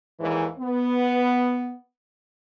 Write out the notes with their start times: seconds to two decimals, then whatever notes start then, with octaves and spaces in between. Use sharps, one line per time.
0.20 D#2 G#2 E3
0.59 B3